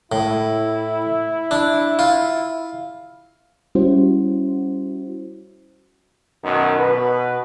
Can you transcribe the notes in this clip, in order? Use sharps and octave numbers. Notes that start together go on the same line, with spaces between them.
A2 E4
D4
F4
G3 C#4 E4 F#4 C5
F#2 B2 D#3 B3 D#4
B2 B4